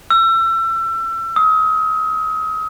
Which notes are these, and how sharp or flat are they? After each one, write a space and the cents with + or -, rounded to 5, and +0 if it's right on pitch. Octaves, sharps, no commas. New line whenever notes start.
E6 +30
D#6 +35